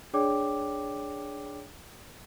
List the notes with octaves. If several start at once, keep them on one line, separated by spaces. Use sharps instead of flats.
D4 G#4 C#5 D5 G5 D6